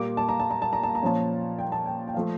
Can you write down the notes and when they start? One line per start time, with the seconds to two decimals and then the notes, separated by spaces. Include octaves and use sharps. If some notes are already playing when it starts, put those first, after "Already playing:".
Already playing: A#2 G3 A#3 D6
0.17 A5
0.29 A#5
0.40 A5
0.50 A#5
0.62 A5
0.73 A#5
0.83 A5
0.95 A#5
1.02 A#2 F3 C#4 A5
1.59 G5
1.72 A5
1.86 G5
2.07 G5
2.14 F3 A3 F5